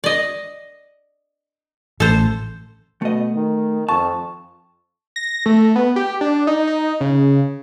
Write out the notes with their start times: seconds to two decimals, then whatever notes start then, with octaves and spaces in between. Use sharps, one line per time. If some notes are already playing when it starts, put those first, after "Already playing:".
0.04 D5 D#5
2.00 A1 A4 C5
3.02 B2 A3 D#5
3.35 D#3
3.89 F2 A5 C#6
5.16 A#6
5.46 A3
5.76 B3
5.96 G4
6.21 D4
6.47 D#4
6.67 D#4
7.00 C#3